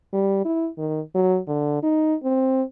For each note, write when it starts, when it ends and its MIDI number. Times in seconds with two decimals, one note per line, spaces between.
0.13 0.41 55
0.45 0.68 64
0.78 1.00 51
1.15 1.38 54
1.48 1.82 50
1.83 2.15 63
2.24 2.63 60